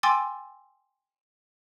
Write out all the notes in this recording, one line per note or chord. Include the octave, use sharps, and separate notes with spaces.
G5 G#5 C6 D6 E6 A6